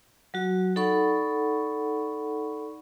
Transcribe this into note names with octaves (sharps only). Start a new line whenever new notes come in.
F#3 F#4
D#4 A4 D5 F#5 B5 C#6